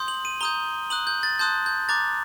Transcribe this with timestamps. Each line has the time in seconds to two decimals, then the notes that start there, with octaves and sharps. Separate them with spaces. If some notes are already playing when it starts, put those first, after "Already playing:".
Already playing: C6 D#6 G6
0.08 F#7
0.25 D#7
0.41 A#5 D#6 G6 G7
0.90 A#5 D#6 F#6 F#7
1.07 G6
1.23 A6
1.39 A5 C6 D#6 F#6 G6
1.66 G6
1.89 A#5 D6 F#6 A6